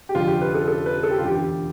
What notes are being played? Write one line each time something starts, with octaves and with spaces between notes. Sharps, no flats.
G4
F1 F2 D3 F3 F4
G4
B4
A4
A4
B4
A4
G4
F4
E1 D2 D3 G4